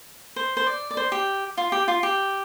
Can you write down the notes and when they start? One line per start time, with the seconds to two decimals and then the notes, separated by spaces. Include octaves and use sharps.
0.36 C5
0.57 C5
0.67 D5
0.91 D5
0.97 C5
1.12 G4
1.57 F4
1.72 G4
1.88 F4
2.03 G4